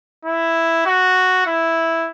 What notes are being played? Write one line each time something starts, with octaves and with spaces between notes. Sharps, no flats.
E4
F#4
E4